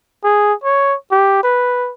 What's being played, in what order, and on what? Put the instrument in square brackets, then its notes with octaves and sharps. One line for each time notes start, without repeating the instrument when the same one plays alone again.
[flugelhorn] G#4
C#5
G4
B4